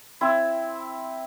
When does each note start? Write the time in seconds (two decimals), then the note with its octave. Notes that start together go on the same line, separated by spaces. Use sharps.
0.21 C4 E4